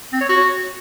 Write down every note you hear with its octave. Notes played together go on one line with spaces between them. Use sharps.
C4
C#5
F#4